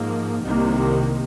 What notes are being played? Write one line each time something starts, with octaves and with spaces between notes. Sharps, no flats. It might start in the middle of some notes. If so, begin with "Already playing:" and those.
Already playing: G#2 F3 A#3
C2 C3 D#3 A#3